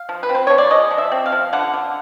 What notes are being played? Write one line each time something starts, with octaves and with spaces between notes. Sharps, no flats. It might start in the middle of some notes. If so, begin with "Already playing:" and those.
Already playing: F5
F3
B4
C4
C5
F3 C#5
D5
G#3 D#5
F3
E5
C4
F5
F3
D3 F#5
D3